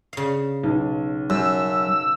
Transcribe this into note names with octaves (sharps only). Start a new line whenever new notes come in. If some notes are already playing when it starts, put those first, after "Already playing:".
C#3 F5
B1
F#2 E6